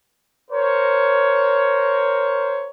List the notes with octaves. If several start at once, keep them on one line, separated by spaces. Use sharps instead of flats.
A#4 C5 C#5